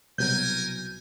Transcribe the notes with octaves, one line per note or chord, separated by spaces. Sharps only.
C2 B2 F#3 A#4 G#5 G6